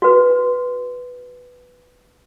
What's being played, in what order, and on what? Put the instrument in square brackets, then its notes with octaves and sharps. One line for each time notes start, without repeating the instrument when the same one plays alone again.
[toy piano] F#4 B4